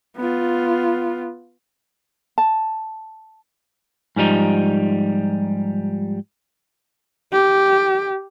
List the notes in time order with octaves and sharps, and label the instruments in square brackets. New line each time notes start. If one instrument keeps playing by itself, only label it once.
[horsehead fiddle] B3 F4
[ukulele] A5
[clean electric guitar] G#2 F3 G3 D#4
[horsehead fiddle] G4